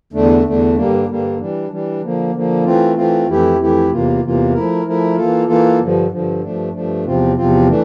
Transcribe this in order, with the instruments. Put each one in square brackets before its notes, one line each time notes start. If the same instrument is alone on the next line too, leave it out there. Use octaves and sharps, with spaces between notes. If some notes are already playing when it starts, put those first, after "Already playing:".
[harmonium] E2 D3 A3 D4
E2 D3 A3 D4
G2 D3 G3 A#3 D4
G2 D3 G3 A#3 D4
E3 G3 D4
E3 G3 D4
D3 F3 A#3
D3 F3 A#3
E3 A3 C4 F4
E3 A3 C4 F4
F2 E3 A3 E4 G4
F2 E3 A3 E4 G4
E2 C3 E3 A#3 F4
E2 C3 E3 A#3 F4
F3 A3 E4 A#4
F3 A3 E4 A#4
E3 A#3 F4 A4
E3 A#3 F4 A4
G2 D3 F3
G2 D3 F3
G2 F3 A3 D4
G2 F3 A3 D4
E2 C3 F3 C4 F4
E2 C3 F3 C4 F4
E3 A3 D4